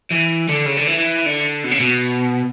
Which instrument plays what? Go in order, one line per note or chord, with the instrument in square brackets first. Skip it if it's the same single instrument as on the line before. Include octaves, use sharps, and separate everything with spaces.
[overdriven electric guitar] E3
D3
C#3
D3
E3
D3
B2
C#3
B2